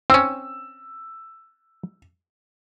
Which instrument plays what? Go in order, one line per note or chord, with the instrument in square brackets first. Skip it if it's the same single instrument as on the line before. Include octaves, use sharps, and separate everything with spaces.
[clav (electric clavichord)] C4 C#4 [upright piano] E6